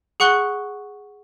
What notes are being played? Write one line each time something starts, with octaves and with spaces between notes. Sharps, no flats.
G#4 F#5 C#6 F#6 G7